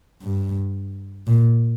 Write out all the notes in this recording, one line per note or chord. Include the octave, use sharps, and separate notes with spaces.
G2
A#2